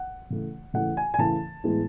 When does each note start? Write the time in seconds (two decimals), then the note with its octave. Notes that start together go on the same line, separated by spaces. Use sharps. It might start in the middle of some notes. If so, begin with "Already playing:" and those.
Already playing: F#5
0.30 C#3 E3 A3
0.74 C#3 E3 A3 F#5
0.97 G#5
1.14 G#5
1.18 C#3 E3 A3 A5
1.64 A2 E3 G#3 B3